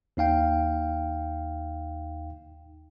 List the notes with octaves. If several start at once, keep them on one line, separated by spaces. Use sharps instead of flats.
D#2 D#4 F5 G5